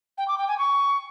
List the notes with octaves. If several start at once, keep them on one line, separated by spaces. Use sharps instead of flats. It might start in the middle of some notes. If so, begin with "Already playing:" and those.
G5
D6
G5
G#5
C#6